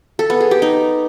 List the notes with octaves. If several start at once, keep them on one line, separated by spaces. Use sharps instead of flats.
A4
B3
G#4
G4
D#4